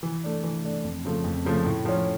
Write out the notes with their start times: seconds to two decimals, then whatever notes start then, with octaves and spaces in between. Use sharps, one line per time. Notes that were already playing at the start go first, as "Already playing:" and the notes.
0.03 E3
0.24 A3 D4
0.43 E3
0.64 A3 D4
0.84 F2
1.05 C#3 F3 A3
1.24 F2
1.45 C#3 F3 A3
1.65 A2
1.85 F3 C#4